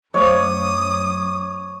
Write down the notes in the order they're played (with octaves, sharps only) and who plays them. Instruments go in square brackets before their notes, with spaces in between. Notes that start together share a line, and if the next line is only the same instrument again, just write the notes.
[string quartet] F#2 D#6 [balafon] F#3 A3 C5 [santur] C#5 [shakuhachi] D6